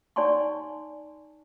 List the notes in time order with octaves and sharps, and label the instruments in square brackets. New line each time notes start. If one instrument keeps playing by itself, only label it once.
[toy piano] D#4 D5 F#5 G#5 C6 C#6